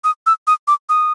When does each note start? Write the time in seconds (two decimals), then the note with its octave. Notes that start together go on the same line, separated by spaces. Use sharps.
0.04 D#6
0.26 E6
0.47 D#6
0.68 D6
0.89 D#6